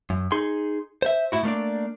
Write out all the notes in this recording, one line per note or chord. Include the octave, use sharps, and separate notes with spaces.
F#2
D#4 G#4 C6
C5 E5
A2 E4 F#4
A3 A#3 D4 D5